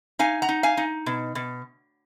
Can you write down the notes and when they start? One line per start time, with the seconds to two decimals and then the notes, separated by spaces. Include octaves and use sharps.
0.19 D#4 F5 G#5
0.42 F#5 A#5
0.49 D#4
0.63 F5 G#5
0.77 D#4
1.06 B2
1.35 B2